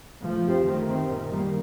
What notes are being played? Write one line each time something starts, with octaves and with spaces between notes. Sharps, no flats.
F3 A3
C4 G4 C5
D#3 A3
C4 G4 C5
A#2 D#3
G3 A#3